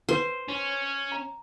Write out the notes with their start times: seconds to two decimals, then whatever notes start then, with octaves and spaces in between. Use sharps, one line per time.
0.09 B4 C5
0.48 C#4
1.12 A#5